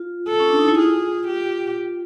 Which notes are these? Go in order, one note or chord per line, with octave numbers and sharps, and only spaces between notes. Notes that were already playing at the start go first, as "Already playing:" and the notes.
Already playing: F4
A4
C#4
D4
D#4
E4
F4 G#4
G4